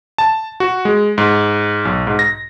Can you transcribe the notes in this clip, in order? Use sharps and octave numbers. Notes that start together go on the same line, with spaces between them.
A5
F#4
G#3
G#2
B1
G#2
A#6